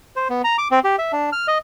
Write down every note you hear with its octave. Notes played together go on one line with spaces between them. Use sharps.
C5
B3
A#5
D6
C4
G4
E5
D4
F6
D#5